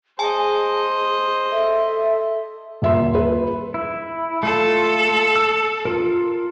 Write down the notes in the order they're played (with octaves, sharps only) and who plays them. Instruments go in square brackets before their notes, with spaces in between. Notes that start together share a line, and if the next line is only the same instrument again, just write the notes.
[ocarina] G#4 [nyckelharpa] C5 D#5 [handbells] G#5 A5
[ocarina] A4 [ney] E5
[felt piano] D#1 E5 C6
B4
[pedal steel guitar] E4
[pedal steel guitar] A3 F4 [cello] A4
[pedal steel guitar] E6
F4 A#4